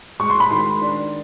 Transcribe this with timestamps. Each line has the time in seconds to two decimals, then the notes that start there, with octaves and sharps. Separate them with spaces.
0.20 G#3 C#6
0.30 C6
0.40 B5
0.51 D#3 C6
0.82 D4